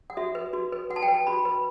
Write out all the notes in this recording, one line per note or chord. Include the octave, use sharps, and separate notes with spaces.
F#5
F#4 E5
B4
F#4
B4
F#4 F#5
A5
G5
B4
A5
F#4 B5
B4 B5